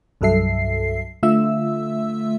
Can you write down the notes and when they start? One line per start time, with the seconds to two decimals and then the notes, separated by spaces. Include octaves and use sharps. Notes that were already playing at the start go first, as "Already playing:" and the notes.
0.21 C2 G2 F#3 A4 E5 C7
1.23 D3 A3 F4 E5 E6